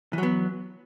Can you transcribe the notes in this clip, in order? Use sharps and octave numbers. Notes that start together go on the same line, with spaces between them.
E3 F#3 B3